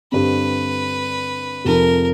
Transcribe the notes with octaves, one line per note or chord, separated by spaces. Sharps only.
G2 D3 G3 C4 B4
F1 F2 C3 F3 A#4